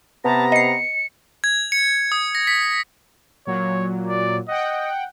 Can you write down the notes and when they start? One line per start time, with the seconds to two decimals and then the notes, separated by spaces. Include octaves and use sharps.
0.25 C3 B3 A5 A#5
0.52 D#5 C7 C#7
1.44 G#6
1.72 C#7
2.12 D#6
2.35 A#6
2.47 B6
3.47 A#2 F#3 C#5
4.07 D5
4.48 D#5 F#5 G5